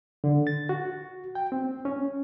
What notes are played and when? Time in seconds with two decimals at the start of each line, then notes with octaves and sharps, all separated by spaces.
0.24 D3
0.47 A6
0.69 F#4
1.35 G5
1.52 C4
1.85 C#4